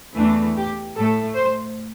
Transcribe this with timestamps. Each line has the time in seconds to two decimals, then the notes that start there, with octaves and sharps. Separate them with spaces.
0.18 E2 E3 A3 D4
0.57 G4
0.96 A2 A3 A4
1.35 C5